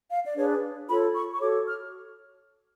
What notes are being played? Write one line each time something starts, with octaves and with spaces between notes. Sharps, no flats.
F5
D5
D4 G#4 B4 C#5
F4 A4 C#5 B5
C#6
C#6
F#4 A4 C#5 D6
F6